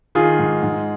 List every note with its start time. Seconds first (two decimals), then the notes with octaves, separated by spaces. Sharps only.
0.15 D#3 F4 G#4
0.39 G#2
0.63 G#2